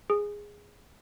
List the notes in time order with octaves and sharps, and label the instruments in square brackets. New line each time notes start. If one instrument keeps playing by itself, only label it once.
[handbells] G#4